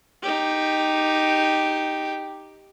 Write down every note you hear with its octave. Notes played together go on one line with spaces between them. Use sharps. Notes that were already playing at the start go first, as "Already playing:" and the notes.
D#4 G4